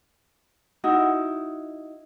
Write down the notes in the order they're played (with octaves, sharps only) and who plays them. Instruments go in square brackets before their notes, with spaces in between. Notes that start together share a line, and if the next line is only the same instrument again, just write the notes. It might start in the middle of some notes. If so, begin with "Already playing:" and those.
[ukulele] D#4 E4 F#4